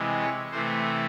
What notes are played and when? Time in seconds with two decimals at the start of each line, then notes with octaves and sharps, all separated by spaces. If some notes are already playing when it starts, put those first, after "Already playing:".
Already playing: C3 E3 G#3
0.19 C#5
0.51 C3 E3 A3 C5